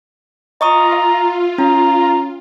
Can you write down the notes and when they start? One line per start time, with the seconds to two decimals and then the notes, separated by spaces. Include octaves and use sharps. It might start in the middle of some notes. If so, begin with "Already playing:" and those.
0.61 F4 D#5 A#5 C#6 D#6
0.92 E5
1.58 C#4 A#5